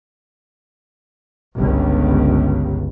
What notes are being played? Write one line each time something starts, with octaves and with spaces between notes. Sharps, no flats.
G1 C#2